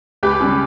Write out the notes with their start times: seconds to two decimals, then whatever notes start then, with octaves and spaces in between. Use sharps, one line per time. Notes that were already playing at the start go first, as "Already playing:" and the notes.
0.23 C#2 G4 B4
0.41 C#3 G3